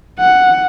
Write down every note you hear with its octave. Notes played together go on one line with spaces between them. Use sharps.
F#5